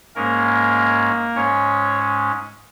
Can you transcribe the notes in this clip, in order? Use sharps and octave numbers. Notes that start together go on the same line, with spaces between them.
G#2 G#3 A#3 C#4 A#4
G#2 G#3 C#4 C#5